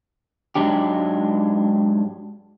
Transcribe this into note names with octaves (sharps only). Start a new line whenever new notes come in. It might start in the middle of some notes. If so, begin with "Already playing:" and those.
G#2 F#3 G#3 D4 G4